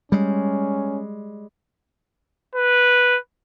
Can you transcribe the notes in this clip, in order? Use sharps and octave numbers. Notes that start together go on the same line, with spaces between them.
G3 G#3 C#4
B4